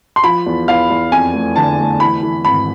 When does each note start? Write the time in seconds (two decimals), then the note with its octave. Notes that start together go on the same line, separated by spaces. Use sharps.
0.16 C6
0.24 F3 B5
0.46 E2
0.68 E2 F5
0.90 E2
1.12 F2 G#5
1.34 A3
1.56 D3 A5
1.79 A3
2.00 E3 B5
2.23 E3
2.45 G#1 B5